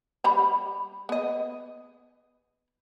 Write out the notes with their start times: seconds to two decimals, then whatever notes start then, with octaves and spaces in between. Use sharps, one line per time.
0.24 G3 A#5 B5
1.09 B3 D#5